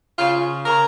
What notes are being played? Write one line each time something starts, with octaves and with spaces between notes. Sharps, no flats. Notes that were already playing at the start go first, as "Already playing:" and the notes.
C#3 F4
C#3 A#4